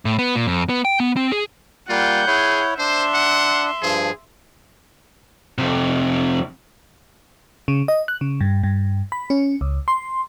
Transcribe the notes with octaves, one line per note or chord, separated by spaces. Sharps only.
A2
B3
A#2
F2
B3
G5
B3
C4
G#4
G3 A#3 F4 F#5 G6
E4 G#4 C#5
D4 C5 E5 C6
F#5
G2 F3 G#4
F2 C3
C#3
D#5
F#6
C#3
G2
G2
B5
C#4
C#2
C6